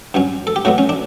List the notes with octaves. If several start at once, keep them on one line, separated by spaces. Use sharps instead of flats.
G2 F#3 C#4
A4
G4
A2 F#3 B3 F#4
C#4
D4